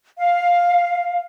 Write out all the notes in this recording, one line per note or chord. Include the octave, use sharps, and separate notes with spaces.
F5